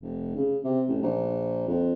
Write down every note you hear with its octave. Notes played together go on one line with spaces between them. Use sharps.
F1
C#3
C3
A1
A#1
F2